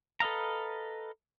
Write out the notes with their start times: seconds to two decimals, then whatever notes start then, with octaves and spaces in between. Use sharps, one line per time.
0.20 A4 B4 D#5 F5 A#5